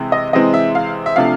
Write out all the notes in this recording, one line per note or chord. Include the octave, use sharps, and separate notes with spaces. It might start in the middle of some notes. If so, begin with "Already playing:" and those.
Already playing: C3 E3 G#3 C4
D#5
C3 E3 G#3 C4 D#5
E5
F5
E5
C3 F3 A3 D4 F5